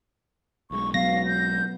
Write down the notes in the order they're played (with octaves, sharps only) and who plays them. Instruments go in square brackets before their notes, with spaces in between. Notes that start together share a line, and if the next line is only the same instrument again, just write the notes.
[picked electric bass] B1 G#3 [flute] C#6
[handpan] F#3 B3 [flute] F5 [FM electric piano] A#6
[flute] G6